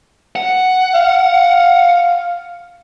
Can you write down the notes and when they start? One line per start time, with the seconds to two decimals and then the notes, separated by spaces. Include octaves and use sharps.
0.36 F#5
0.94 F5